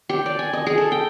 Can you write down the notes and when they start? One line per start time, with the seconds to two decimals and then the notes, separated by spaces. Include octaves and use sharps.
0.09 G4
0.26 D5
0.39 G#5
0.53 D#5
0.67 G#4
0.78 A4
0.92 G5